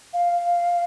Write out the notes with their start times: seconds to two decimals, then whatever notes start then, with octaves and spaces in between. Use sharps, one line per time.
0.13 F5